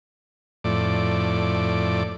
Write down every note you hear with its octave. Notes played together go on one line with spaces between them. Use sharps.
F2 A2 D5